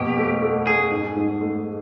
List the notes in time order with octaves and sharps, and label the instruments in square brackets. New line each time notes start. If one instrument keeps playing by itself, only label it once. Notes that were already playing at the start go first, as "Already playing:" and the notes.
Already playing: [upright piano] F2 B2 A#3 [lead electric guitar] G4
[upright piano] A3
A3
[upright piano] A3 [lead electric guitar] G#4
[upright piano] G#2
G#2
A3